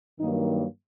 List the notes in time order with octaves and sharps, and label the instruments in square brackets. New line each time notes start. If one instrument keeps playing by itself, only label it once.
[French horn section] G2 D#3 F#3 A#3 D#4